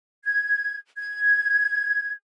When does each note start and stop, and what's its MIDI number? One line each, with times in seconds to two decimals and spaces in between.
0.25 0.77 92
0.98 2.12 92